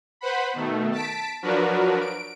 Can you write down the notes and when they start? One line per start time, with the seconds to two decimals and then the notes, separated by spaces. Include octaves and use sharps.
0.21 B4 C5 F#5 B5
0.53 B2 D#3 A3
0.92 A5 B6 D7
1.42 F3 F#3 D4 F#4 A#4 B4
2.00 D7